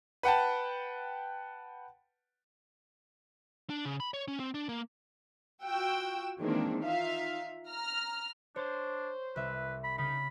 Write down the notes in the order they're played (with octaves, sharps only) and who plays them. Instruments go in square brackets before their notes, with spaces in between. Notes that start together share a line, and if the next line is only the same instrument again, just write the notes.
[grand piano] B4 F#5 G5 A5
[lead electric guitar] D4
C#3
B5
C#5
C#4
C4
D4
A#3
[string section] F4 F#4 G5 E6
D#3 E3 G#3 A#3 C4 D4
D#4 F4 E5 F5
A#5 F6
[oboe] D4 [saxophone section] C5 [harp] C#5
[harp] C2 E5 [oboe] B4
[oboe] B5
[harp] C#3 [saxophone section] D#4 [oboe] B5